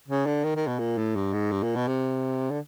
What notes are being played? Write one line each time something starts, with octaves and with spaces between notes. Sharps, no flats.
C#3
D3
D#3
D#3
B2
A#2
A2
G2
G#2
G2
A#2
B2
C3
D3